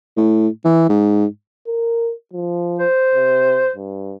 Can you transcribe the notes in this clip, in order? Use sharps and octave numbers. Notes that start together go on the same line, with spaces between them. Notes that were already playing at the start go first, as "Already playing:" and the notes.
A2
E3
G#2
A#4
F3
C5
C3
G2